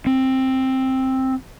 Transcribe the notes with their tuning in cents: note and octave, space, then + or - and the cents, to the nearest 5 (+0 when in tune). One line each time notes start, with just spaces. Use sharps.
C4 +10